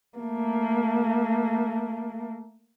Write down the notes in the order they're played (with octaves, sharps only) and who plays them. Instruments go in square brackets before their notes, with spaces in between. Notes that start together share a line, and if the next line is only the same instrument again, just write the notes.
[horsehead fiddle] A3 A#3